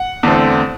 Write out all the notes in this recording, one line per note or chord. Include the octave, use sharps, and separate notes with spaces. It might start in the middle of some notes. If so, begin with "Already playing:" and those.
Already playing: F#5
E2 D3 A3 C4